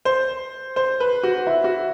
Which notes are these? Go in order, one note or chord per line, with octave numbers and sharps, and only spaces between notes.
C5
C5
B4
F#4
E4
F#4